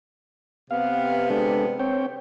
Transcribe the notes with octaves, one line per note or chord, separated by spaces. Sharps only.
C3 B3 F5
G#3 D4 A4
C4 C#5 G5